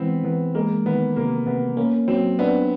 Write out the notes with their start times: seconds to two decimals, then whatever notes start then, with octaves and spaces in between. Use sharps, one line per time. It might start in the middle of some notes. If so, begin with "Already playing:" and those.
Already playing: E3 G#3 B3 C4
0.23 E3 B3
0.55 G#3 A#3
0.86 D#3 B3
1.16 C3 A#3
1.46 C3 B3
1.77 A#3 C#4
2.08 F#3 C4
2.39 B3 D4